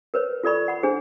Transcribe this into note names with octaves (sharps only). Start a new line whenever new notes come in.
A#4 B4 C#5
F4 A4 D5 B5 C#6
F#5 B5
D4 G#4 C5